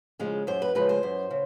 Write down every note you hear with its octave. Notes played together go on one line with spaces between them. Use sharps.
C#3 F3 G#3
F#2 C5
B4
C#3 F3 G#3 B4
C5
F#2
C#3